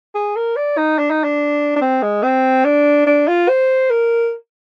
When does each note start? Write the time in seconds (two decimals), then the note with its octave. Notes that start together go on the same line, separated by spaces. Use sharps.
0.15 G#4
0.36 A#4
0.56 D5
0.77 D#4
0.98 D4
1.10 D#4
1.24 D4
1.76 D4
1.81 C4
2.02 G#3
2.23 C4
2.64 D4
3.06 D4
3.28 F4
3.48 C5
3.90 A#4